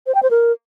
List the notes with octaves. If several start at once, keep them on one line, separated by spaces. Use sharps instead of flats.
C5
G5
C5
A#4